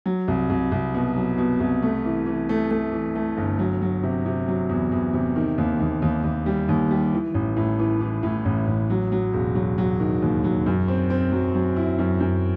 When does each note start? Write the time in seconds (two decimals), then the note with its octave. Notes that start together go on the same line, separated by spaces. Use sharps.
0.06 F#3
0.28 C2
0.50 C2
0.72 C2
0.95 B2
1.16 F#3
1.38 B2
1.60 C2
1.82 A3
2.05 E3
2.26 E3
2.49 A3
2.71 A3
2.92 E3
3.15 A3
3.37 G1
3.59 F#3
3.82 F#3
4.03 C3
4.26 C3
4.48 F#3
4.69 E2
4.92 E2
5.14 C3
5.36 D#3
5.58 D#2
5.80 D#2
6.02 D#2
6.24 D#2
6.46 G3
6.69 D#2
6.91 G3
7.13 E3
7.34 A1
7.57 A2
7.79 E3
8.01 E3
8.23 A2
8.45 A1
8.67 A1
8.90 F#3
9.12 F#3
9.33 E1
9.55 F#3
9.78 F#3
10.00 D#3
10.22 D#2
10.44 F#3
10.66 F#2
10.88 C4
11.10 C4
11.32 F#3
11.55 F#3
11.76 E4
11.99 F#2
12.20 F#2